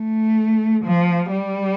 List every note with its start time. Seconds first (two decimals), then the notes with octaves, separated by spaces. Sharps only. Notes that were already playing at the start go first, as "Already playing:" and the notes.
Already playing: A3
0.85 F3
1.31 G3